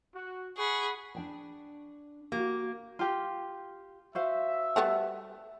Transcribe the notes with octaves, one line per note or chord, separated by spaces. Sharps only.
F#4
G#4 F#5 B5 C#6
D4 G5 A5
A#3 F#4 G4
F4 G4
F#4 C5 E5 F5
G3 A3 B3